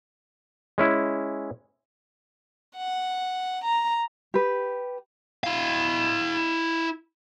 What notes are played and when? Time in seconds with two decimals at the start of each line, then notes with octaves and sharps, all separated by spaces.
0.78 G#3 C#4 E4
2.77 F#5
3.64 A#5
4.34 G4 B4
5.44 E4 F5